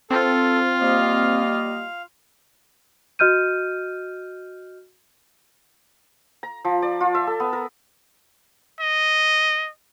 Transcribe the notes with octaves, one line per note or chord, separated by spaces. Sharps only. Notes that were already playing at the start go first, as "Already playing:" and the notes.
C4 F4 A4
G3 A#3 D#5 F5
F#4 D#5 F6 G6 D#7
A#5
F3
D5
F4
E5
A4
B3
A#4
D#5